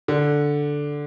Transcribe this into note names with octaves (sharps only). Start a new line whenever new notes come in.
D3